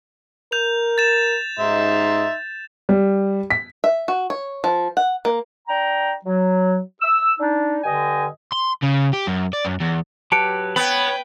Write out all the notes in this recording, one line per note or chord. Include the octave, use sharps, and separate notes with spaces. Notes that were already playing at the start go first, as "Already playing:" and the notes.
A#4 G6 F7
A6 E7
G#2 D#4 E5 C6
G3
B6
E5
F#4
C#5
F3
F#5
A#3
D4 G5 A#5
F#3
E6
D4 D#4
G2 D3 D#5 G5 G#5
C6
C#3
G4
F#2
D5
F#2
E2
F#3 G4 B4 A5 C#7 D7
B3 B4 C#5 G5 B5